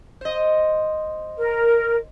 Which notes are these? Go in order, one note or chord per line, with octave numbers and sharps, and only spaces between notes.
C5 D#5
A#4